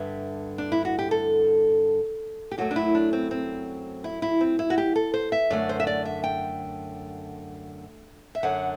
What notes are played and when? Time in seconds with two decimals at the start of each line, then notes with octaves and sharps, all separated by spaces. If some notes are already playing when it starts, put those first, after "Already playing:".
Already playing: G2 D3 G3 E5
0.58 D4
0.72 E4
0.85 F#4
0.99 G4
1.11 A4
2.51 G4
2.58 F#2 F#3 A3 F#4
2.71 D4
2.76 E4
2.95 D4
3.13 C4
3.31 C4
4.04 E4
4.22 E4
4.41 C4
4.59 E4
4.70 F#4
4.78 G4
4.96 A4
5.14 C5
5.32 E5
5.50 F#2 D3 A3 D5
5.69 C5
5.80 E5
5.87 D5
6.05 E5
6.24 G5
8.35 E5
8.43 F#2 D3 F#3 F#5